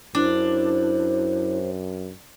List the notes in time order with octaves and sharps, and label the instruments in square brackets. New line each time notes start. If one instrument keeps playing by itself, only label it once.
[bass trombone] F#2 [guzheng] D4 [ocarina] E4 [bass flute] C5